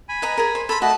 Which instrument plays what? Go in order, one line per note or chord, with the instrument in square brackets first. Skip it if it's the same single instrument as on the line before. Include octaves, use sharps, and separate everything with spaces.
[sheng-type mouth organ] G#5 B5
[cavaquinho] B4 D#5 A#5
G#4 A#4
C5
[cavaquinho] A4 C6 [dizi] B5
[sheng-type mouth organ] A3 D#5 [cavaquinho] F#4 [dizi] A5